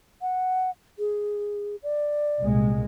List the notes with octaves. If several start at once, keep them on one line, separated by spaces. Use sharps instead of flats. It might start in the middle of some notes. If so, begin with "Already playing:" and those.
F#5
G#4
D5
C2 A#2 G#3